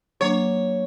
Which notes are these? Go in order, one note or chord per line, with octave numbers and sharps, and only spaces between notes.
F#3 A#3 D4 C#5